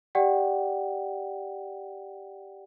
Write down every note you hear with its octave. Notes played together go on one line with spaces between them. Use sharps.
G4 D5 F#5 G5